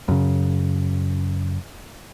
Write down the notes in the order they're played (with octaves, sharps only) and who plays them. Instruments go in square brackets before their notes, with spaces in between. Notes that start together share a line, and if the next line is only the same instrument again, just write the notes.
[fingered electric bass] F#2 C#3